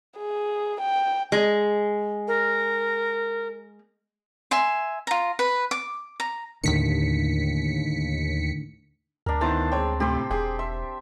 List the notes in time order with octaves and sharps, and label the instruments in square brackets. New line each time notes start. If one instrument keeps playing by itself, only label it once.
[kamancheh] G#4
G5
[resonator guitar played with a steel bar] G#3
[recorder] A#4
[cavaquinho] E5 G#5 C6
F4 A#5
B4
D6
A#5
[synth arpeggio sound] D#2 B6 C#7 [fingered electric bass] A2 D3 D#3
[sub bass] D2 [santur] D4 A#4
[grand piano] D#3 B3 E4 [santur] C5 A5 A#5
[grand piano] G#3 C#5 G5 [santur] C4
[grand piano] A2 C3 [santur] G4 C5
[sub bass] E1 [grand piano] G#4 [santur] G5
[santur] E5 [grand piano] C6